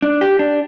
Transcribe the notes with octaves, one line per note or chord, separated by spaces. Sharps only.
D4
G4
D4